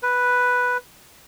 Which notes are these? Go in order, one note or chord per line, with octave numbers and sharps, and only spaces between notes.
B4